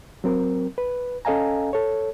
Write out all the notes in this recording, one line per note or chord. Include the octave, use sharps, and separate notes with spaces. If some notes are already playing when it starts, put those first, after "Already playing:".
F#3 C4 A#4
B4
C#4 A4 D#5 F5 G#5 A#5
A4 C#5